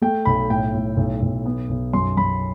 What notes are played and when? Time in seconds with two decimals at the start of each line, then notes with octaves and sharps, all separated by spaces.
0.02 A3 G5
0.25 B1 B5
0.50 A2 G5
0.74 A2
0.97 B1
1.22 B1
1.45 B3
1.69 B1
1.93 F#2 C6
2.17 F#2 B5